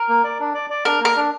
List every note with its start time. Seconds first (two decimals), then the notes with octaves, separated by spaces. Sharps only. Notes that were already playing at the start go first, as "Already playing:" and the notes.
Already playing: A#4
0.09 A#3
0.24 D5
0.39 D4
0.54 D5
0.70 D5
0.85 D4 A#4
1.00 A#3 A#4
1.16 D4